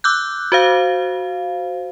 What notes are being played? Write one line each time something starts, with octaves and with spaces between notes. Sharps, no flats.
D6 E6 F#6 G6
F#4 C5 F5